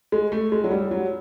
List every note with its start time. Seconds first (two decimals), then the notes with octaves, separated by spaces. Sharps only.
0.12 G#3
0.32 A3
0.52 G#3
0.64 F#3
0.71 G3
0.91 F#3